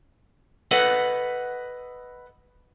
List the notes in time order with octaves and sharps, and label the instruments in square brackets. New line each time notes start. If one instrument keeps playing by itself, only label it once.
[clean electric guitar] A4 B4 D#5 F#5